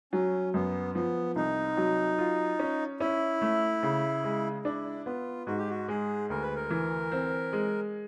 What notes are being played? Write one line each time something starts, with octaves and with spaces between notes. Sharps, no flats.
F#3 C#4
F#2 B3
F3 B3
C2 D#4
F#3
F4
C#4
C#4 E4
A3
C#3
G#3
D4 E4
B3 F4
G#2 F#4
G4
F#4
G#3 G#4
D2 A#4
B4
A#4
E3
C4
G#3